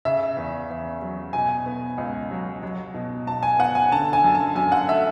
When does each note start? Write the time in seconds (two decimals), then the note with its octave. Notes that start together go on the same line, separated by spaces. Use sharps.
0.05 C#3 E5
0.37 E2
0.70 E2
1.02 F#3
1.33 B2 G#5
1.66 B3
1.98 C#2
2.31 F#3
2.63 F#3
2.94 B2
3.27 B2 A5
3.43 G#5
3.59 B3 F#5
3.75 G#5
3.91 D3 A5
4.13 G#5
4.24 F#2
4.35 A5
4.56 F#2 G#5
4.72 F#5
4.88 A3 E5